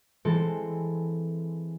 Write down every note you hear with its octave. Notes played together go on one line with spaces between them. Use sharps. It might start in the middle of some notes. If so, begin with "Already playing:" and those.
E3 G#3 C4 A4